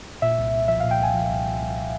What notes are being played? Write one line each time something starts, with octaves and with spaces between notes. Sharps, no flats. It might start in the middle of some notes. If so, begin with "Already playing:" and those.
A#2 E5
C2
C2
F3 E5
A#2 F5
G5
C2 G#5
F3
C2
C2
C2